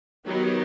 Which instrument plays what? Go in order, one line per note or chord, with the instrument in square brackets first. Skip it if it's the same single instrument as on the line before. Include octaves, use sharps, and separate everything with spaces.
[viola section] D#3 F#3 B3 D#4 G4